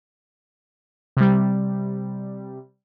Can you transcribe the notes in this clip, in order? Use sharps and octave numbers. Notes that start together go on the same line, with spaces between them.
C3 G3